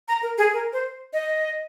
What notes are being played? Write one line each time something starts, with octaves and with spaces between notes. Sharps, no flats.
A#5
A#4
G#4
A#4
C5
D#5